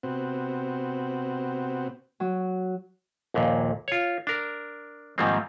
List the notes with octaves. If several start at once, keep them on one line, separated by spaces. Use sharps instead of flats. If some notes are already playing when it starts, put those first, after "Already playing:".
C3 B3 C4 F#4
F#3
A#1 D#2 A#2
F4 C#5
D4 A#4
G#2 D#3 F3 G3 A#3 C4